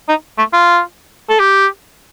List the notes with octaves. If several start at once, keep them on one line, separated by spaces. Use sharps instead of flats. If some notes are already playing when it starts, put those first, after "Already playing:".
D#4
A3
F4
A4
G4